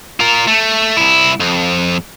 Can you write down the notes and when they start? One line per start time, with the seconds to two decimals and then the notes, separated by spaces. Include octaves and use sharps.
0.20 F4 A#4
0.48 A3
0.97 C2 E4
1.40 F2